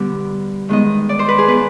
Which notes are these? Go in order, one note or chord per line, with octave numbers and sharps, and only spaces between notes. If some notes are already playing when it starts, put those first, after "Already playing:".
Already playing: B2 D3 G3 B3 D5
D#3 G#3 B3 D#5
D5
C5
B4
G#4
D#3 B3 B4